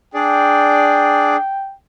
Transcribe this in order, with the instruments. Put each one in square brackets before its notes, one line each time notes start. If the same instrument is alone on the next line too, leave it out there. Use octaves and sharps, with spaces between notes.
[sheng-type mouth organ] D4 G#4 D5 [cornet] G5